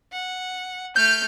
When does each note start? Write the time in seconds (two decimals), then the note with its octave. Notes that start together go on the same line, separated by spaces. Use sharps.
0.13 F#5
0.96 A3 F6 G6